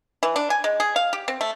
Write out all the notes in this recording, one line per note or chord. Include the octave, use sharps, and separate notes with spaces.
E3
D4
G#5
G#3
G#4
F5
G4
C4
A3